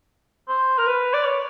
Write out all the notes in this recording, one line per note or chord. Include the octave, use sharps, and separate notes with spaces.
C5
A#4
B4
D5
C#5